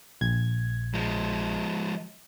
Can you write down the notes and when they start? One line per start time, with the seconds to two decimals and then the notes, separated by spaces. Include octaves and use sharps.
0.21 A#1 G#6
0.94 F3 G#3